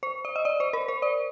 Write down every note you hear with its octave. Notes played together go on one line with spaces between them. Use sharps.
C5
D5
D#5
D5
C5
A#4
C5
D5